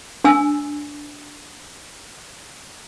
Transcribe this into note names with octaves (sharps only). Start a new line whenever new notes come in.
D4 G#5 E6